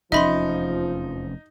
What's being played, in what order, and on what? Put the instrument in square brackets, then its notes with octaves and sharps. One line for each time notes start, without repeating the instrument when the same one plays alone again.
[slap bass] F1 E2 C#4 [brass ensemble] F3 [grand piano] D#4 [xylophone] E5 B5 C6